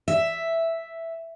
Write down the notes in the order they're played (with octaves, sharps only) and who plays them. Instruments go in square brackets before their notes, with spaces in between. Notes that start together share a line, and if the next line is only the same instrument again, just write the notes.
[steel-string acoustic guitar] E5